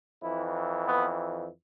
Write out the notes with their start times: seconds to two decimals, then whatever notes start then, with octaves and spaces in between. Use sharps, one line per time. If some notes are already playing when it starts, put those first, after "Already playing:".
0.22 F2 E3 E4
0.86 B3